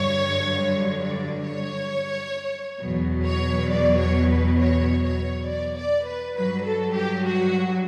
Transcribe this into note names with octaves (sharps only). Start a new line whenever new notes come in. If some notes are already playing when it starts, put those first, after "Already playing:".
Already playing: G2 D3 F#3 C#5
D5
C#5
E2 B2 F#3
C#5
D5
C#5
B4
C#5
C#5
D5
D5
B4
G2 F#3 B4
A4
G4
F#4